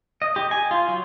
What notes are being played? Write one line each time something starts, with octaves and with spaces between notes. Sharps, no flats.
D#5
G4
G#5
F4
F#3